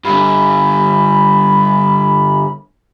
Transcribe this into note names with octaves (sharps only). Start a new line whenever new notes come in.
G2 D3 B5